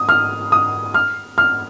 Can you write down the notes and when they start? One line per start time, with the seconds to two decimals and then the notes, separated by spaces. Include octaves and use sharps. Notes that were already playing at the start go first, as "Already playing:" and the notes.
Already playing: D#6
0.09 F6
0.52 D#6
0.94 F6
1.38 F6